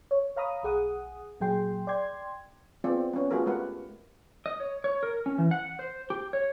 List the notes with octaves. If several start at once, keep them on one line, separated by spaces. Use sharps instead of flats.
C#5
C#5 F5 A#5 B5 D#6
B1 G#4 F#5 D#6
A#2 F#3 G#4 G5 C6
D5 G5 C6 G#6
B3 C4 F4 G#4 C5 D5
B3 C#4
A3 B3 F4 F#4 G#4 A#4
G#3 A3 G4 A#4 B4 F#5
D#5
C#5
C#5
A#4
C#4
E3
F#5
C5
G4
C#5